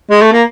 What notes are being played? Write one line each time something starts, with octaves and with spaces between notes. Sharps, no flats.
G#3
A3
A#3